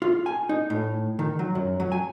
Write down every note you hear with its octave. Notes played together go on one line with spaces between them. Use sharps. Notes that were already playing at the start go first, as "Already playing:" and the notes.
F4
G#5
D#4
A2
D#3
F#3
F#2
F#3
G#5